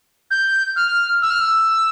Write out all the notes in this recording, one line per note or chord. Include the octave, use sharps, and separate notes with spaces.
G6
F6
E6
F6
E6